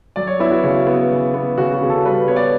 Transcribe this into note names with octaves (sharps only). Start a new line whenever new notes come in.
F#3 D5
C#5
B3 E4
F#4
C#3 C#5
B3
C#3
B3
C#3 F#4
F#4
C#3
A4
G3 B4
B3 C#5
D5